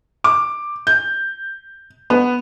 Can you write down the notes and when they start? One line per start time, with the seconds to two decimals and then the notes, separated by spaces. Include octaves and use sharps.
0.24 D6
0.87 G6
2.10 B3